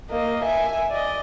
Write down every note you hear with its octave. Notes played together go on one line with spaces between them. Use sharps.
A#3 D#5
E5 G#5
D5 D#5